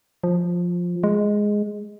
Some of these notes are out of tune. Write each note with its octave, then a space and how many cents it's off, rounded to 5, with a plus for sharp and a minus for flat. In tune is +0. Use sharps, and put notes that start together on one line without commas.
F3 +10
G#3 +0